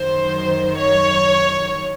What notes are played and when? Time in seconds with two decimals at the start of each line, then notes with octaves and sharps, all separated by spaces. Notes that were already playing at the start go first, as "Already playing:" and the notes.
Already playing: F#2 D#3 F#3 C5
0.77 C#5